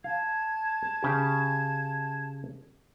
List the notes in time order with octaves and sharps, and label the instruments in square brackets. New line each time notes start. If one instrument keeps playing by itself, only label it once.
[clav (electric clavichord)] F5 [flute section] A5 G#6
[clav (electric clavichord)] C#3 G4